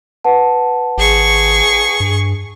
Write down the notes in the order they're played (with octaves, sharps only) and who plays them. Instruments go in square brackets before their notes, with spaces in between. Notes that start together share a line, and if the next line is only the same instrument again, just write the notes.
[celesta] B4 F#5 A5
[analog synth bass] G#1 [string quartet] G#4 C#6
[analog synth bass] G2